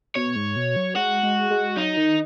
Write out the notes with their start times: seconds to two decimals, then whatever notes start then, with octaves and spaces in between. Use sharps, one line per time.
0.16 B2 C#5
0.36 G#2
0.56 B2
0.76 F#3
0.96 G#3 F#4
1.23 G#3
1.50 G#3
1.77 F#3 D#4
1.97 D#3